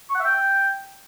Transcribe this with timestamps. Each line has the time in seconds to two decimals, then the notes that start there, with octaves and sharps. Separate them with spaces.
0.10 C#6
0.15 F#5
0.20 E5
0.25 G5